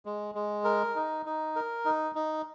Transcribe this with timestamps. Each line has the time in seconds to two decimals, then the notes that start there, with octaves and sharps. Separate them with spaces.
0.05 G#3
0.35 G#3
0.64 A#4
0.96 D#4
1.26 D#4
1.56 A#4
1.85 D#4
2.15 D#4